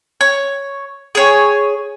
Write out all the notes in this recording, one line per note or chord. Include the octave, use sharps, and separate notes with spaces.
C#5
G#4 C#5